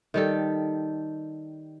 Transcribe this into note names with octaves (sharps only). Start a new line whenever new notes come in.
D#3 G3 A4